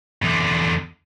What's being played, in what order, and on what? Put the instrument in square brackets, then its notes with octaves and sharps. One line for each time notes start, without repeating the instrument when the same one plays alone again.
[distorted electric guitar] E2 D3